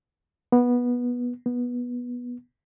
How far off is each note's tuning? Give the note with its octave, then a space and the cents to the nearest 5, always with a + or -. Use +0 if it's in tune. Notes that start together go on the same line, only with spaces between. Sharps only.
B3 -15
B3 -15